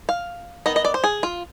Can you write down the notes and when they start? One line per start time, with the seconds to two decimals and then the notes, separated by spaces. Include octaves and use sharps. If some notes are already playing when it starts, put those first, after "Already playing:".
0.09 F5
0.66 D#3 B3 D#4 D#5
0.76 D#5
0.85 D5
0.94 C5
1.04 G#4
1.23 F4